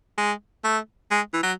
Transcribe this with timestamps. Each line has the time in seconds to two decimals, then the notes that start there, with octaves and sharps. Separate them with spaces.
0.18 G#3
0.64 A3
1.11 G#3
1.33 E3
1.43 F#3